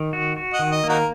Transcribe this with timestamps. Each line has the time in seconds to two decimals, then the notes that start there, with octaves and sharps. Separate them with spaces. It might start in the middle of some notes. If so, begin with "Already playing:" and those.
Already playing: D#3
0.13 F#4
0.37 F#4
0.53 D#5 F#5
0.59 D#3
0.72 D#5
0.84 A#3
0.89 D#4 F#4 A#4